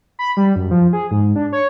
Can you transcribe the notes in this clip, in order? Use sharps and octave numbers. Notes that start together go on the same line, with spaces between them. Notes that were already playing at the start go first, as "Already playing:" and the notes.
B5
G3
F#2
F3
G#4
G#2
D4
C#5